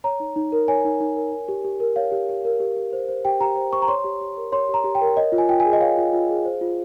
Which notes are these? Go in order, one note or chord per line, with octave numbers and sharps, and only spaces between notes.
C#5 A#5
D#4
D#4
A#4
C#5 G#5
D#4
D#4
A#4
C#5
G4
G4
A#4
C#5 F5
G4
G4
A#4
G4
G4
C5
C5
G4 G5
G4 A#5
C5
C5 C#6
A#5
C#5 C6
G4
G4
A#4
C#5 C6
G4 A#5
G4
G5
A#4
C#5 D#5
F4
G#5
F4 G5
G#4 G#5
D#5
C#5 F5
F4
F4
G#4
C5
F4